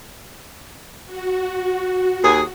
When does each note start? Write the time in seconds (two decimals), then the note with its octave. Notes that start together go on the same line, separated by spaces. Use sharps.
1.06 F#4
2.24 D#2 G#4